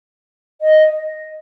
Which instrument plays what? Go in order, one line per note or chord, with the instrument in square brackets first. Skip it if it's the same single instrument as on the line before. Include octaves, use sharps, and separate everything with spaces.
[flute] D#5